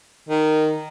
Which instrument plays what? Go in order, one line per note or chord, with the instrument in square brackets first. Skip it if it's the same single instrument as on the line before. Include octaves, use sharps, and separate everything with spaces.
[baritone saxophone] D#3